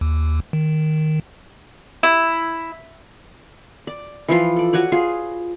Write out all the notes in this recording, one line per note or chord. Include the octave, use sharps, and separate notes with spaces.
D#2
D#3
E4
D5
E3 F3 F4
A4 D5
F#4 B4 C#5 D5
F4 G#4